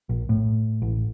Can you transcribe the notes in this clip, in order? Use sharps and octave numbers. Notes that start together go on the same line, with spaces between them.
A#1
A2
A1